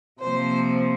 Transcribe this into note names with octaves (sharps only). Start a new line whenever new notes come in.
C3 F3 A#3 C5